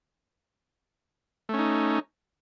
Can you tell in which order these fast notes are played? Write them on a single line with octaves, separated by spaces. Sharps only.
A3 C#4 D#4